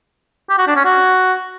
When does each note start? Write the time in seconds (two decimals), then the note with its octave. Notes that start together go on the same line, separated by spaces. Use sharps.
0.50 G4
0.58 F#4
0.67 D4
0.76 C#4
0.85 F#4